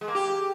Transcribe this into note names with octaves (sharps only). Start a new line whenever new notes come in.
G#3
A#3
G4